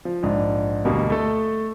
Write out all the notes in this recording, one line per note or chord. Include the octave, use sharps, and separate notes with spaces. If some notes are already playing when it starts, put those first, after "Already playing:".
F3
A#1 G#2
D2 B2 G3 A#3
A3 A4